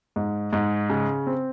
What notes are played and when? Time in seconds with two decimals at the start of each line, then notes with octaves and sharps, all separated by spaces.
0.16 G#2
0.53 G#2
0.90 C#3
1.27 C4